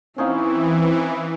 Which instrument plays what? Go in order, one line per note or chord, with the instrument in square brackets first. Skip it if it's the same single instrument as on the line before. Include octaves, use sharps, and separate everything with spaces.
[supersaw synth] E3 [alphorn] C4 [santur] C#4 D#4 F5 [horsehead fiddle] E4